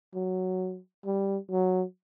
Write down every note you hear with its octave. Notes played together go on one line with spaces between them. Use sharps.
F#3
G3
F#3